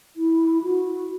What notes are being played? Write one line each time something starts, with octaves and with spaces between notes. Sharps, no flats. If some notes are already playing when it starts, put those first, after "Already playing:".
E4
F#4